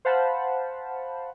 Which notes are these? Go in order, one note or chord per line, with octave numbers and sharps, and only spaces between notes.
C5 F5 F#5 A5 B5